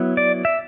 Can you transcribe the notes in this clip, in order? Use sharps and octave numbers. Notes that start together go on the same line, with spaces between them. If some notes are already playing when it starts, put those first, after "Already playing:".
Already playing: F#3 B3 E4
D5
E5